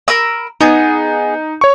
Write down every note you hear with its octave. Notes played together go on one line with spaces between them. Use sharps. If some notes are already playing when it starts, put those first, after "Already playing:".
A#4 B5 E6
B3 D#4 G#4
C#5 C#6